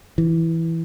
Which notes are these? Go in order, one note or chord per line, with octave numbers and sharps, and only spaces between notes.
E3